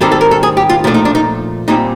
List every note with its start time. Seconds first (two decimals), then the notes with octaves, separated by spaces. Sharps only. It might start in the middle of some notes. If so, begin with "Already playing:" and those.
0.01 G#2 D#3 G3 C4 A4
0.12 A4
0.21 A#4
0.31 A4
0.43 G#4
0.57 G4
0.70 F4
0.84 A#2 F3 A3 D4 E4
0.94 D#4
1.05 D4
1.15 D#4
1.68 A#2 G3 C4 D#4